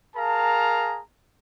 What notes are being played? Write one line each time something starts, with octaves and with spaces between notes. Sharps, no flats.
G#4 A#4 F5 A5 A#5